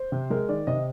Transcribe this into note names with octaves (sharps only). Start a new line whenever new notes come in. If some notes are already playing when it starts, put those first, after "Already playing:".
Already playing: C5
C3
G#3 A#4
D#3 D5
C3 D#5